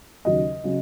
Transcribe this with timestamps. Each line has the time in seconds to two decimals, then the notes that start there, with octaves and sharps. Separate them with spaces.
0.25 D#2 C#3 F#3 D#5
0.64 C#3 F#3